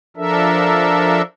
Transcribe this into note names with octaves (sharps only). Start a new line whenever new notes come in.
F3 D4 A4 A#4 E5